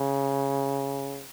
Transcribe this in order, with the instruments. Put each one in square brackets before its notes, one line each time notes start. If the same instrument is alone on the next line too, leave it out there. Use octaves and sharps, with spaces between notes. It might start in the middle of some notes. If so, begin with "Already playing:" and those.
Already playing: [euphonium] C#3